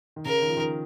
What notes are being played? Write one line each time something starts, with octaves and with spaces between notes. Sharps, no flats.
D#3
C#3 A#4
D#3
F3
D#3